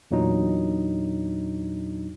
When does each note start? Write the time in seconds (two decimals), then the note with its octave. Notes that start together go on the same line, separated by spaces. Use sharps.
0.11 E2 A#2 F#3 D4 D#4